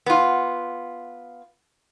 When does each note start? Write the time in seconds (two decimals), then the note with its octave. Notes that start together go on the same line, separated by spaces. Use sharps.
0.06 B3 F4